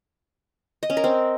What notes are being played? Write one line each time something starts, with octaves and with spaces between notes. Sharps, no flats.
D#5
C#4
A#4
C4